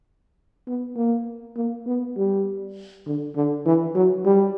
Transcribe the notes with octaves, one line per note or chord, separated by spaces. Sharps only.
B3
A#3
A#3
B3
G3
D3
D3
E3
F#3
G3